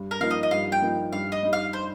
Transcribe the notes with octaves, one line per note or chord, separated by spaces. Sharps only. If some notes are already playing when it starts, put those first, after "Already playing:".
Already playing: G2
A#4
F3 A#3 D#4 F5
D#5
D#5
G2 F5
G5
F3 A#3 D#4
G2 F5
D#5
G3 D#4
F5
C5